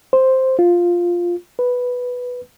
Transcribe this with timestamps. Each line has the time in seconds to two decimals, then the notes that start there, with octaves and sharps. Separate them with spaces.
0.13 C5
0.59 F4
1.59 B4